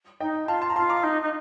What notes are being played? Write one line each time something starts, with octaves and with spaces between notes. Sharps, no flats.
D#4 D#5 G5
F4 F5 A5
A5 C6
A#5
F4 A5 C6
A#5 D6
D#4
D#4